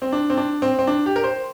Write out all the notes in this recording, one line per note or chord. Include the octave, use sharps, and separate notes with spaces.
C4
D4
C4
D4
C4
C4
D4
G4
A#4
C5